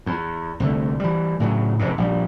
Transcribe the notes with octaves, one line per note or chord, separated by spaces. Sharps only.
E2
C2 D3 A3
E3 G3
A2 C#3 F#3
F1 F2 G#2 C3
A#1 C3 G3